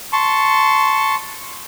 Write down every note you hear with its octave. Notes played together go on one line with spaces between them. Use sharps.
A5 C6 C#6